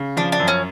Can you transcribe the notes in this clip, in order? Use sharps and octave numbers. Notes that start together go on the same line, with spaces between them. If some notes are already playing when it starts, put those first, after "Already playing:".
Already playing: C#3
F3 D4
D4
F#2
C#4